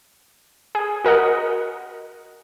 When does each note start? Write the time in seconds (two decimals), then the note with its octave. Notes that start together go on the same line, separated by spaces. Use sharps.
0.75 G#4
1.04 F#4 A#4 D#5 F#5